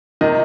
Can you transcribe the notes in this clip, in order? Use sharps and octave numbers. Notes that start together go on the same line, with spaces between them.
C3 D#3 D#5